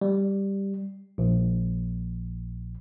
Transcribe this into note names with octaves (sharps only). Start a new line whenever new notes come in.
G3
A#1